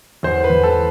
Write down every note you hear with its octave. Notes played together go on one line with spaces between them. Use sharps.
E2 C5
B4
E2
A4